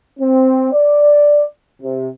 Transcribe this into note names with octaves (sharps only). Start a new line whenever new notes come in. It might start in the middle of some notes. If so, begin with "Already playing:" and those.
C4
D5
C3